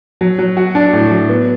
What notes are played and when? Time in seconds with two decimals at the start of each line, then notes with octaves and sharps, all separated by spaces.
0.21 F#3
0.39 F#3
0.57 F#4
0.75 D4
0.93 A2
1.10 F#3
1.29 B3